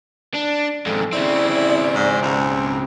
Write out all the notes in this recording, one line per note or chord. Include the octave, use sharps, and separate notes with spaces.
D4
F2 G#2 A4
C#3 C4 E4 D5
G#2
C#2